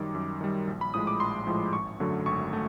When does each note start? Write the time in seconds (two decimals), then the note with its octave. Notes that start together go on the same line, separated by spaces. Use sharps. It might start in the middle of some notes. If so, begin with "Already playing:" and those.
Already playing: F#2 D#3 G3 D6
0.15 F#2
0.41 D#3 G3
0.67 A#1
0.81 B5
0.94 A2 F3 G#3 D#6
1.07 D6
1.20 A#1 C6
1.47 A2 F3 G#3
1.73 G#1 C#6
2.00 F#2 D3 F#3 A3
2.26 G#1 C#6
2.53 A3